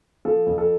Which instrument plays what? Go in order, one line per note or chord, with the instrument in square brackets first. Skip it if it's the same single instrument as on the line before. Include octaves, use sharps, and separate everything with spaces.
[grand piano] F3 A4
F2
A4